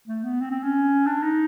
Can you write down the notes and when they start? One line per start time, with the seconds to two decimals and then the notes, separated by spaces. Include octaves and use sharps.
0.08 A3
0.24 B3
0.41 C4
0.51 C4
0.63 C#4
1.06 D4
1.23 D#4